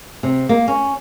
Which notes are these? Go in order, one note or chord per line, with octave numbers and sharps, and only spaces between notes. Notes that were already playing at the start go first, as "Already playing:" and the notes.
C3
A#3
C#4